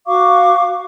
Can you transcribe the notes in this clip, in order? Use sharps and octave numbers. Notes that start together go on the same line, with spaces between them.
F#4 F5 C#6 D6